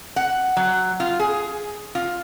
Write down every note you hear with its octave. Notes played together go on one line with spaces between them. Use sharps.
F#5
F#3
F4
G#4
F4